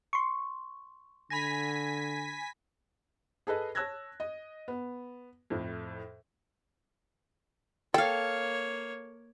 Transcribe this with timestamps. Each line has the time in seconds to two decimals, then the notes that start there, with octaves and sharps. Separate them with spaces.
0.13 C6 C#6
1.30 D3 G#5 B5 A#6 B6
3.47 G#4 A4 B4 D#5
3.75 C#5 A5 E6 F#6 G#6 A#6
4.20 D#5
4.68 B3
5.50 F2 A2
7.94 A#3 A4 C#5 F5 G5